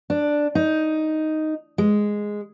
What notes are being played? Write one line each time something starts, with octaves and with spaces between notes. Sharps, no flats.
D4
D#4
G#3